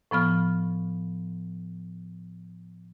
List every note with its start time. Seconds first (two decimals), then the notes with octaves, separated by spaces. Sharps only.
0.11 A2 F3 B3 F6